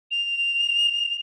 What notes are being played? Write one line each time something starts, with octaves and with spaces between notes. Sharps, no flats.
F7